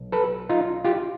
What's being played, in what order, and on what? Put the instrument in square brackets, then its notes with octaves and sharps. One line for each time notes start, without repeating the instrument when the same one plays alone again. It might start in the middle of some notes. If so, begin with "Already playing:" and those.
Already playing: [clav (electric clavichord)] B1
A4 B4
D#4 F4
F4 G4